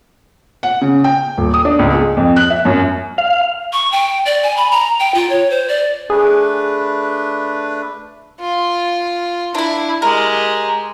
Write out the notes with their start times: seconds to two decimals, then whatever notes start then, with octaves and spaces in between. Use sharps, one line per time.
0.63 F#5
0.81 C#3
1.04 G5
1.37 D#1
1.54 D#6
1.65 D4
1.79 C#2
1.94 G#3
2.17 F2
2.36 F#6
2.50 E5
2.65 F#2
3.18 F5
3.73 C#6
3.92 G5
4.26 D5
4.43 G#5
4.57 B5
4.71 A#5
5.00 G5
5.14 F4
5.30 C#5
5.51 C5
5.69 D5
6.10 A3 D4 G#4 B4
8.40 F4
9.55 D4 E4 B5
10.02 G#3 G4 A#4